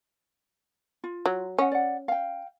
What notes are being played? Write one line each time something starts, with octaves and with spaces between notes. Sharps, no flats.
F4
F#3
C#4 D#5 F#5
D5 F#5
F5 G5